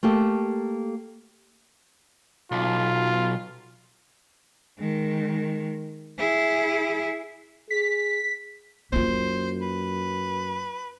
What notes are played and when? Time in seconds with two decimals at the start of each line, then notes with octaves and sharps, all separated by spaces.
0.03 A3 A#3 G4 A4
2.52 B1 F4
4.79 D#3 G#3
6.18 E4 G#4
7.71 G#4 B6
8.92 F#2 A#3 F4 C5
9.62 B4